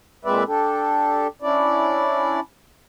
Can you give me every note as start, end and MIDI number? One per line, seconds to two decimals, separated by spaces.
0.25 0.43 46
0.25 0.43 56
0.25 0.43 60
0.25 0.43 71
0.25 0.43 74
0.25 0.43 76
0.47 1.27 62
0.47 1.27 67
0.47 1.27 69
1.42 2.40 61
1.42 2.40 62
1.42 2.40 64
1.42 2.40 74